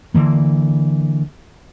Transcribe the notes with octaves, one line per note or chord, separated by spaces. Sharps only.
D3 E3 A#3